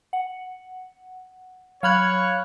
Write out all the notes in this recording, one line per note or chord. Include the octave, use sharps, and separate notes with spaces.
F#5
F#3 C#5 F5 B5 F6 F#6 G#6